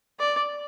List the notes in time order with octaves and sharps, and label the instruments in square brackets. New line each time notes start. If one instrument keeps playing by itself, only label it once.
[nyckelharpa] D5